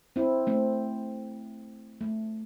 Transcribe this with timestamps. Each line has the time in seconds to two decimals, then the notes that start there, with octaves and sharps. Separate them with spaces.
0.16 C4 E4
0.47 A3 C4
2.01 A3